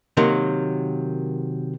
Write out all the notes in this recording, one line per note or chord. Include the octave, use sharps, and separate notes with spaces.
C3 D#3 F#3 A#3